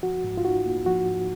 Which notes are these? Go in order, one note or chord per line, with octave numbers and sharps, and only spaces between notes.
F3 F#4
G#2
F4
D#4 F#4
A#3
F3 F#4
G#2